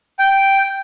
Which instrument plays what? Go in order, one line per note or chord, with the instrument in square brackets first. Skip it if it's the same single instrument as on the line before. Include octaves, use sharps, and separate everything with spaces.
[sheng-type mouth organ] G5